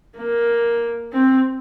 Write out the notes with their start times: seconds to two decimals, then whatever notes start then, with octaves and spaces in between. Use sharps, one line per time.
0.18 A#3
1.13 C4